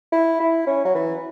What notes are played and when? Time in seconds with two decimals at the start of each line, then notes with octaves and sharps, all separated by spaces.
0.12 E4
0.40 E4
0.67 C#4
0.85 F#3
0.95 E3